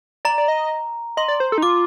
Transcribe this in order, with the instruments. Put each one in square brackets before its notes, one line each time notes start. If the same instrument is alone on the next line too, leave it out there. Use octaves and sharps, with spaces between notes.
[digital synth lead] D5 [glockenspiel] A#5
[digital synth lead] D5
D#5
[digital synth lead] D#5 [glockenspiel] C6
[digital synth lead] D5
C5
A4
D#4
[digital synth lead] F4 [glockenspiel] D6